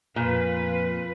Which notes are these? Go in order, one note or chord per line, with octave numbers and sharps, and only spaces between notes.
F2 A#2 F4 B4